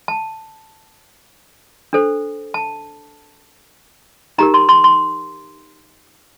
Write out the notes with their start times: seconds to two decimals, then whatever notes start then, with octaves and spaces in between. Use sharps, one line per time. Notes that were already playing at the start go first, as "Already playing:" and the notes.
0.08 A5
1.93 D4 A4 C5
2.54 A5
4.38 D#4 G4 A#4 A#5
4.54 C6
4.69 C6
4.84 C6